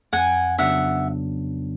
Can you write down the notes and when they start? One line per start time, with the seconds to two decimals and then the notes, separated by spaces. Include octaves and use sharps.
0.13 F2 F#5 G#5
0.58 C#3 F#3 B3 D4 E5 F#5